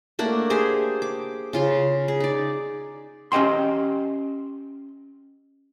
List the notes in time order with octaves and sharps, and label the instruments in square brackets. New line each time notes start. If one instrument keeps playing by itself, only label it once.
[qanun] A3 A#3 D4 F#5
G4 G#4 C5 G#5
D6
C#3 F4 C6
G#4
D#4 D5
[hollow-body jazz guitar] C#4 G4 D#5 G5 C6